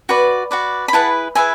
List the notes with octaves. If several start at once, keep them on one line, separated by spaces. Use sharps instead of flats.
F#4 B4 D5
F#4 B4 D5
B5
E4 G#4 B4 F#5 A5
E4 G#4 B4 E5 G#5